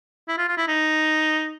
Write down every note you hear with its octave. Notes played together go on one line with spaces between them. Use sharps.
E4
F4
F4
E4
D#4